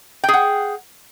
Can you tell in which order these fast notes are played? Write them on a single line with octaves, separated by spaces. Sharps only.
G5 G#4 F#5